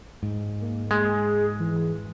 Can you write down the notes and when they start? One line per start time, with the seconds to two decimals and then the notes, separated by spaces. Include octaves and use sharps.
0.23 G#2
0.62 A#3
0.91 G#3 G#4
1.60 E3